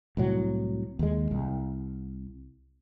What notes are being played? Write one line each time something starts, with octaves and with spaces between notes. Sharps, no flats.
C2 A2 F#3
D#2 G#3
C2